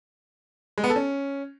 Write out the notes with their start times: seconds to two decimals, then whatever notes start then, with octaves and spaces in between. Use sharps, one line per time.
0.78 G#3
0.84 B3
0.90 A4
0.96 C#4